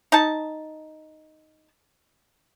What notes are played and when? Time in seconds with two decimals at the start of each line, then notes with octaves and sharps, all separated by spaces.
0.12 D#4 A5